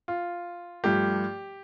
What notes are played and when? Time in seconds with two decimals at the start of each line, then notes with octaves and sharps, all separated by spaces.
0.08 F4
0.84 G2 F3 A3 G4